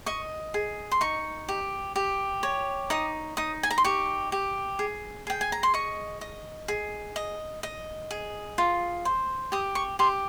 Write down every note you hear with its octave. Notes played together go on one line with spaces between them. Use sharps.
D#5 C#6
G#4
C6
D#4 C#6
G4
G4
C#5
D#4 D#6
D#4 D#6
G#5
A#5
C6
G4 C#6
G4
G#4
G#4 G5
G#5
A#5
C6
D#5 C#6
D#5
G#4
D#5
D#5
G#4
F4
C5
G4 D#6
C#6
G4 C6